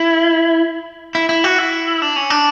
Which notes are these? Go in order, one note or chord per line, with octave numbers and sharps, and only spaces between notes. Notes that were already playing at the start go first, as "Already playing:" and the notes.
Already playing: E4
E4
E4
F#4
E4
D4
C#4
D4